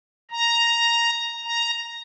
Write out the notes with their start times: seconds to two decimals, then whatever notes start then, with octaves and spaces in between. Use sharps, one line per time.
0.31 A#5
1.44 A#5